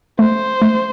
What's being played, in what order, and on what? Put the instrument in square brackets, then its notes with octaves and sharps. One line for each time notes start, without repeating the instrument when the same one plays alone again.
[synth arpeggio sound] A3 [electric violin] C5
[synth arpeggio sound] A3